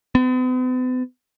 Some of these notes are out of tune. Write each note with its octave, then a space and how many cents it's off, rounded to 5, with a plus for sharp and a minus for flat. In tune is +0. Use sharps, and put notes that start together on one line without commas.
B3 +45